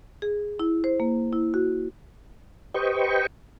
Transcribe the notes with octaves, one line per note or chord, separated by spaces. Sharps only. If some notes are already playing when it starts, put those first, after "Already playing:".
G#4
E4
C5
A#3
E4
F#4
G4 B4 C5 D#5 G5 C#6